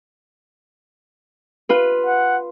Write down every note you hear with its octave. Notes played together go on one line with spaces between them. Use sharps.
F4 B4
F#5